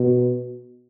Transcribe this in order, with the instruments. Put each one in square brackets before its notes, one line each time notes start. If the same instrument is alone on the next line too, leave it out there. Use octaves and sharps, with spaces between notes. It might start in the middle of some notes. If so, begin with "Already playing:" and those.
Already playing: [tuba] B2